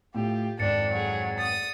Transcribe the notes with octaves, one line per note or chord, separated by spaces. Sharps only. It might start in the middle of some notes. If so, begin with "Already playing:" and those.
A2 F4 G4
G#1 F2 D4 A4 A6 C#7
F#3 G#4
D#6 A6